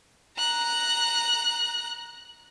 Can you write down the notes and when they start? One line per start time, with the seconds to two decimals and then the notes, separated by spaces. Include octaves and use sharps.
0.37 A#5 F#6